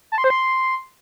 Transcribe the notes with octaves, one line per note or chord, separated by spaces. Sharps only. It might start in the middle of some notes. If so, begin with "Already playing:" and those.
A5
C6
C5
C6